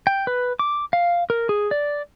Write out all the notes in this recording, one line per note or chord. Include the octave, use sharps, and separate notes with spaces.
G5
B4
D6
F5
A#4
G#4
D5